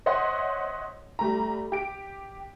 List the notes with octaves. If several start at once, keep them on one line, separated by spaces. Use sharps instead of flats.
C5 C#5 D#5 E5 F#5 C6
G3 A3 A#5
G4 D7